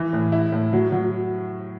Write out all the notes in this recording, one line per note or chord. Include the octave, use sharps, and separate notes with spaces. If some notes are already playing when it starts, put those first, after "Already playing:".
Already playing: E3
A2
E4
A2
F#3
F#3